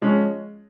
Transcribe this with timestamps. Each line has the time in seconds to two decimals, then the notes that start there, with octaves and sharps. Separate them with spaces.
0.01 F3 G#3 C#4